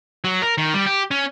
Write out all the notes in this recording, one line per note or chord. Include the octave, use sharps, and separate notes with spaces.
F#3
A#4
D#3
G3
G4
C#4